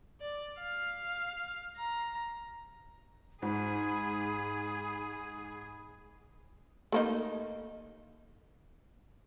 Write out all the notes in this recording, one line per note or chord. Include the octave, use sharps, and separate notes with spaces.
D5
F5
A#5
G#2 G#4 B5
A3 A#3 D#4